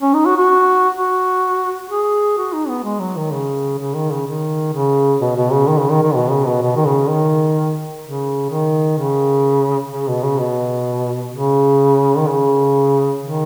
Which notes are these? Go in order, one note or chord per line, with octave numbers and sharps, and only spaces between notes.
C#4
D#4
F#4
F#4
F#4
G#4
F#4
D#4
B3
G#3
F#3
D#3
C#3
C#3
D#3
C#3
D#3
C#3
B2
B2
C#3
D#3
C#3
D#3
D#3
B2
C#3
B2
B2
D#3
C#3
D#3
C#3
D#3
C#3
C#3
B2
C#3
B2
C#3
D#3
C#3
D#3